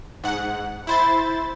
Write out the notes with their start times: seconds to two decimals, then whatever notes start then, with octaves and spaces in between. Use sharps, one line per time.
0.24 G#2 F#5
0.87 E4 C5 B5 A6